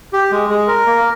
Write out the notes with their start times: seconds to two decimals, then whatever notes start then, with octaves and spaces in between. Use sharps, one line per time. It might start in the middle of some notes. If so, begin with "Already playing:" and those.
0.13 G4
0.31 G#3
0.49 G#3
0.67 A#4
0.86 A#3